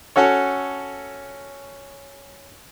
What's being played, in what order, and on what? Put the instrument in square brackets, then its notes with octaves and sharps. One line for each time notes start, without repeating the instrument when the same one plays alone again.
[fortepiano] C#4 F#4 A4 C#5